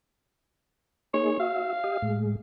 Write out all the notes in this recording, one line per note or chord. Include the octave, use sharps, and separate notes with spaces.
A#3 D#4 G#4 C#5
F#4 E5 F5
G4 D#5
A2 G#3